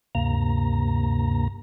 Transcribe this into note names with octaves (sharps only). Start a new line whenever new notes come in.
D2 G2 C3 A#3 A#5